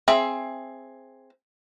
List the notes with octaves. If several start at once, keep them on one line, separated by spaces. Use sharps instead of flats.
C4 G#4 E5